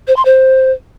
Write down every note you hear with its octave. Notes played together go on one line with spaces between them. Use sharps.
C5
C6
C5